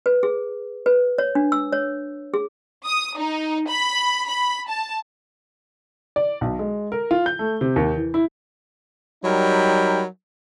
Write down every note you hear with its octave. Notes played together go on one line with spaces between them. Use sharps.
B4
G#4
B4
C#5
D4
E6
C#5
G#4
D#6
D#4
B5
B5
A5
D5
B1
G#3
A#4
F4
G6
A3
C3
D#2
E3
E4
F#3 G3 D#4 A#4 G5 B5